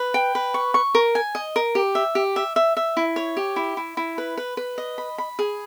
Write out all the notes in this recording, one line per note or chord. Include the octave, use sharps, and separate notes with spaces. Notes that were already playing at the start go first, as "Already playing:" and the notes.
Already playing: B4
G5
B4
C#6
C#6
A#4
G#5
D#5
A#4
G4
E5
G4
E5
E5
E5
E4
C#5
G4
E4
E4
E4
B4
B4
B4
D#5
B5
B5
G#4